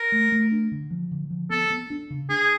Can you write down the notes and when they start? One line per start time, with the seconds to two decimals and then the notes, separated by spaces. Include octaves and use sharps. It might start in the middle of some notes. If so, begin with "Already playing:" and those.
Already playing: A#4
0.12 A3
0.32 A3
0.52 D4
0.72 D3
0.91 F3
1.11 D3
1.30 F3
1.50 B3 A4
1.70 B3
1.90 D4
2.10 C#3
2.30 D4 G#4